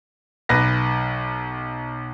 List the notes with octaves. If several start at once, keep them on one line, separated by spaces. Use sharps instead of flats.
B1 B4 A#6